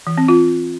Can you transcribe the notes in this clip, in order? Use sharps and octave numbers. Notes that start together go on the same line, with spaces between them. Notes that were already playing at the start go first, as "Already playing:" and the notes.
E3
C4
F4